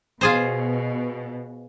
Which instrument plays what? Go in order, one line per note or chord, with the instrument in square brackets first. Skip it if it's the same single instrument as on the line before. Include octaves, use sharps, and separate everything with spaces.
[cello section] B2 [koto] F4 G#4 C5